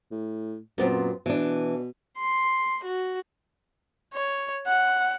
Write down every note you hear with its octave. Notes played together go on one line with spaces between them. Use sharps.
A2
F#2 A#2 B3 C4
B2 E3 D4
C6
F#4
C#5
F#5